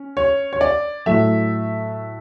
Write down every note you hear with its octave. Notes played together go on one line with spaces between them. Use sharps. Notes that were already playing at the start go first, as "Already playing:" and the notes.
Already playing: C#4
C#5
C#5
D5
A2 F#3 A3 E5